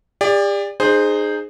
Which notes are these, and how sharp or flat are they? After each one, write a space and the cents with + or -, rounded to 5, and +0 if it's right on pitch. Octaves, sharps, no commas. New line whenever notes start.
G4 +45 D5 +0
D#4 -30 G#4 +0 C5 +0